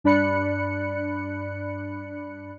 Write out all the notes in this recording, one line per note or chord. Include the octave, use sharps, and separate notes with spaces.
G2 D4 D5 B5 F#6 C#7